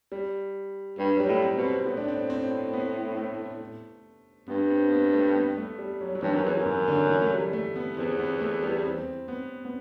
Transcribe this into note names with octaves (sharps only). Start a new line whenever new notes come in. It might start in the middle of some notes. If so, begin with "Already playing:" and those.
G3
G2 G3
F#3
G3
A2
C4
B2
C4
A2 B3
D4
C4
C4
C4
B3
A3
G2 B3
C4
B3
A3
B3
A3
G3
F#3
F#3
G2 E3
F#2
E2 F#3
F#2
E3
D3
E3
A3
G3
A3
B3
E2 C4
B3
A3
G3
C4
B3
B3